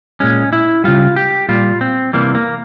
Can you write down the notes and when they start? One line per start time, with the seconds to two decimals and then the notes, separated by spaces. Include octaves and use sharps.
0.20 A#2 G#3 C#4
0.53 E4
0.84 C#3 G3 F4
1.16 G4
1.49 A#2 G3 F4
1.81 C4
2.13 C3 E3 G3 A#3
2.35 A#3